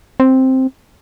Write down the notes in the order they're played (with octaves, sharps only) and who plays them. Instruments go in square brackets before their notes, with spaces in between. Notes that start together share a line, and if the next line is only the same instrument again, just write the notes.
[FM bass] C4